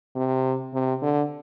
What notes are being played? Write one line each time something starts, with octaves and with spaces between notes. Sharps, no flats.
C3
C3
D3